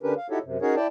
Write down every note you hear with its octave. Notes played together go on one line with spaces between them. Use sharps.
D3 C#4 D4 G4 A#4 B4
F5
D#4 E4 F#4 G4 A4 C#5
F#2 C3
C#4 D#4 F#4 G#4 A#4 C#5
E4 D5 G5 A5